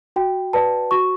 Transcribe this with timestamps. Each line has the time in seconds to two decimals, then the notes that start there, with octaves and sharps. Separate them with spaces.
0.16 F#4 G5
0.53 B4 D5 A5
0.91 F#4 C#6